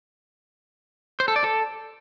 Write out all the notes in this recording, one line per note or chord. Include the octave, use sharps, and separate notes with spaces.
C5
A4
D5
A4